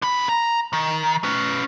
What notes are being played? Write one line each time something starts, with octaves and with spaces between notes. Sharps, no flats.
D3 B5
A#5
D#3
C#4 B4